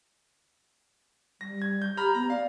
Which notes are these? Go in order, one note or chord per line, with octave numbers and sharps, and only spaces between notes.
G3 A#6
G#6
G6
G4 A#5 B5 F6
B3 A#5
D5 F5